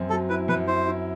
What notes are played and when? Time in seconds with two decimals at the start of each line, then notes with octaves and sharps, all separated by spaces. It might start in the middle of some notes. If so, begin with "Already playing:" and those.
Already playing: F#2 C4
0.10 F#3 A4
0.29 E4 B4
0.48 F#2 B4
0.67 E4 C5
0.87 E4